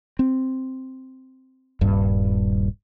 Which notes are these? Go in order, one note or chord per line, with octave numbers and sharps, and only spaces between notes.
C4
D#1 G2